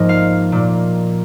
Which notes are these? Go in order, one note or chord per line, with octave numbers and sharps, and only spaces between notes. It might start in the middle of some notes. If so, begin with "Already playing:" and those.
Already playing: G#2 F3 A#3 D#5
F5
A#2 A#3